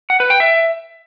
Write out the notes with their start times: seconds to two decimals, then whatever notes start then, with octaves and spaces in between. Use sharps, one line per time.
0.10 F#5
0.20 B4
0.30 G5
0.40 E5